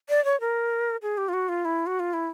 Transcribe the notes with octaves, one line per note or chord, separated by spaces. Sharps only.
D5
C#5
A#4
G#4
G4
F4
F#4
F4
E4
F#4
F4
E4